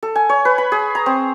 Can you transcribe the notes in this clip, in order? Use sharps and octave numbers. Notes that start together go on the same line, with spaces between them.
A4
G#5
C#5
B4
B5
G#4
A#5
C4